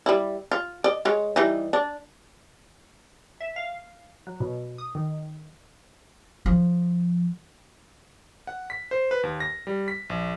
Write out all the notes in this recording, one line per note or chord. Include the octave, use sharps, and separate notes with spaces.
G3 E4
F4
D5 D#5
G#3 C#5
E3 G3 D#4
D4
E5
F5
F#3
B2
D#6
D#3
F3
F#5
B6
C5
B4
D#2
A#6
G3
B6
A#1